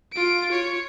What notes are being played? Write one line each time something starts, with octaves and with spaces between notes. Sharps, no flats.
F4 D7
C#5